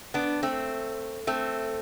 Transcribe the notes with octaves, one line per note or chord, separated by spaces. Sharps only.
B3 D4
A3 C4
A3 C4